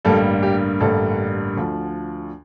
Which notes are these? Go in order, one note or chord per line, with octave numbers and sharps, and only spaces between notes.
A1 G2 D3 G3 A#3 A4
G4
A1 G2 D3 G3 A#3 A4
D2 D3 F3